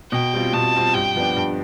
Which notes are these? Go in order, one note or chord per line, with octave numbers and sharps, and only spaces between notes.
B2 G5
G3 C4 F4
B2 A5
G3 C4 F4
G2 G5
F3 B3 D4
G2